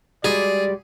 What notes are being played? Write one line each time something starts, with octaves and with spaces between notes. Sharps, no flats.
G3 G#3 F#4 G#4 D5